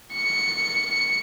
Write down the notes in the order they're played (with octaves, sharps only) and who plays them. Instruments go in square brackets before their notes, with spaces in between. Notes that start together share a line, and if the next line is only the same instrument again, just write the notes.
[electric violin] C#7